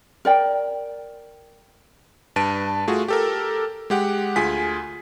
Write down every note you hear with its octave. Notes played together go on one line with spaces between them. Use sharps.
A#4 D5 G5
G2 B4 A5 D7 D#7
A3 F4 F#4 G#4
G4 A4 A#4
G#3 G4 F#5
D2 F4 G#4 G#5 B6